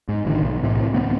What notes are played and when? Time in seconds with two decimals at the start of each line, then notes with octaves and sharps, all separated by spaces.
0.09 G#2
0.25 A1 D3 D#3
0.42 B1
0.63 A2 C3 E3
0.94 D2 B3 C4